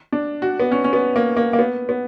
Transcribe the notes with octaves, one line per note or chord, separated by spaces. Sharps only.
D4
F#4
B3
C#4
C#4
B3
A#3
A#3
A#3
B3
B3